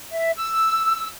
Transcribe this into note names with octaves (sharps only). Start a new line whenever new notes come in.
E5
E6